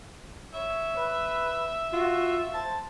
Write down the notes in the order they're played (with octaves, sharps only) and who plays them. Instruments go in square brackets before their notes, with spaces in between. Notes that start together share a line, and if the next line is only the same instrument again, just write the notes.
[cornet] C#5 [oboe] E5
[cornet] B4
[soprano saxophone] F4 [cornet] F#4
[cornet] C5 [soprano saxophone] A5